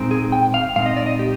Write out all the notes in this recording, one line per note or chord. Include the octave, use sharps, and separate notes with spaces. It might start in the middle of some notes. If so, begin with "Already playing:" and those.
Already playing: A#2 G#3 C4 D#4
G#4
G5
F5
A#2 G#3 C4 D#4 F5
D#5
D5
D#5
G4